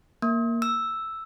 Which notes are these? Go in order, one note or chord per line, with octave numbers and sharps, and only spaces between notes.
A#3
E6